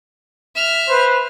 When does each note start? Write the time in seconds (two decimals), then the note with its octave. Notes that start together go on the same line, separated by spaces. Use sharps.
0.55 E5 F6
0.88 B4 C5